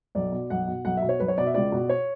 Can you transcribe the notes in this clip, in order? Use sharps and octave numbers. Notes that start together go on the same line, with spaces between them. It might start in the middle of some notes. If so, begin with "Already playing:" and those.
B1 D5
B2
B1 F#5
B2
B1 F#5
E5
B2
C#5
B1 B4
C#5
B2 D5
E5
C#2 D5
B2
C#5